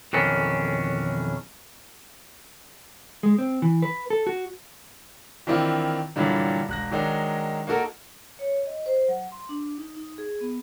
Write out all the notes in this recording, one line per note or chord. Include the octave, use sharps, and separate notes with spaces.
B1 F2 D#3 E3 C#4 D4
G#3
C4
E3
B4
A4
F#4
D#3 E3 C4 D4 E4 F4
G2 A#2 D3 E3 F#3 G3
E1 F#6 A#6
D#3 F#3 G#3 D4 D#4
A#3 D#4 F#4 A4 A#4
C#5
D#5
C5
F#3
C6
D4
D#4
D#4
G#4
B3